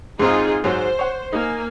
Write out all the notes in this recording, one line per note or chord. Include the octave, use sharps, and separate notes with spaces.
G#2 C4 D#4 F4 G#4
G#2 F#3 C5
C#5 F#5
A#3 D#4 G#5